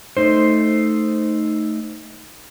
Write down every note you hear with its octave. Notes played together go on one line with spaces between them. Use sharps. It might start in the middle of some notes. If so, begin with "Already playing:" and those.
A3 D#4 C5